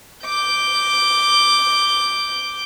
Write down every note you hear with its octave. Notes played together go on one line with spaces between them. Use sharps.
D6 G6